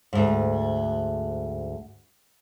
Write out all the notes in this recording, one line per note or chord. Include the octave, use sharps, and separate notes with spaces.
D2 G#2